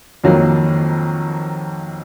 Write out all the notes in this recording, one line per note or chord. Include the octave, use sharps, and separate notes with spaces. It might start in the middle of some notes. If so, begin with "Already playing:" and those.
F2 D#3 F#3 A#3